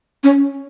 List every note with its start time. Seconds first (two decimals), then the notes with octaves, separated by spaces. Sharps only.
0.24 C#4